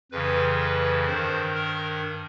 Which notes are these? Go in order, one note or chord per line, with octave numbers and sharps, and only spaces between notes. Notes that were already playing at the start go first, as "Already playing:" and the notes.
F2 C#3 E3 B4
B4
G2 D#3 C5
A#4